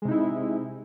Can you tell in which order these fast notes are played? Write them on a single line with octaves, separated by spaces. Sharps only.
G#3 C3 D#4 E4